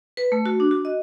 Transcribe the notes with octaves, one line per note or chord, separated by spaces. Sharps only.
B4
A3
F#4
D4
F#4
D#5